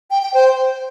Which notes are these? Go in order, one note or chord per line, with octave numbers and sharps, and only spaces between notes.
G5
G5
C5